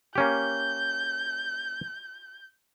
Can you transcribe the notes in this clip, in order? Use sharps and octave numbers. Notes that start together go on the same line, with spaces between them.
A#3 C#4 G4 G6